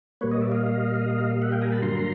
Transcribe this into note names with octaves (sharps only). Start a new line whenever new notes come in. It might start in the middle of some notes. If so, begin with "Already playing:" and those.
A#2 G3 A#3 B4 C#5
C#5 D#5
D5 E5
D#5 F5
E5 F#5
F5 G5
G#5 A#5
A5 B5
G2 D3 F#3 A#3 A#5 C6